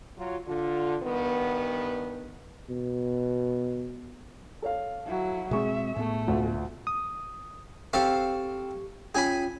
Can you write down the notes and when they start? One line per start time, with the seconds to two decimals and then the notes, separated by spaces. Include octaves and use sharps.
0.18 F#3 F4
0.47 D3 F4
1.03 G2 D#3 B3
2.70 B2
4.62 A4 C#5 F5
5.07 F#3 E4
5.51 B2 G#3 C4 G#4 E5 C#6
5.96 A2 A3 B3
6.28 D2 B2 F4
6.87 D#6
7.93 C4 G4 A4 F5 C#6
9.15 C#4 F4 G#4 G5 G#5 B5